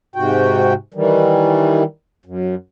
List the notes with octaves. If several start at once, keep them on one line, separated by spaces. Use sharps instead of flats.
G#2 C3 F#4 G5
D#3 E3 G3
F#2